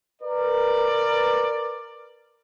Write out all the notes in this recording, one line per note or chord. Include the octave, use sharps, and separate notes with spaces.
A#4 B4 D5